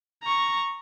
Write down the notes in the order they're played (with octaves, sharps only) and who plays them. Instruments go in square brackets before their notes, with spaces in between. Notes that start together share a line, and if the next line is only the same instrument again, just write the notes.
[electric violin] A#5 C#6